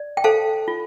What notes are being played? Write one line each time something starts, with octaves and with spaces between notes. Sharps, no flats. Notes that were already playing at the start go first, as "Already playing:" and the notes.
Already playing: D5
G5
A4 C5 F5 A5
F4